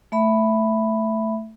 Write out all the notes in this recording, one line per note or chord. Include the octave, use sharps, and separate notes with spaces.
A3 E5 B5